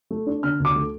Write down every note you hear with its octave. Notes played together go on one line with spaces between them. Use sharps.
A3
D4
D3 F6
D2
D6
A3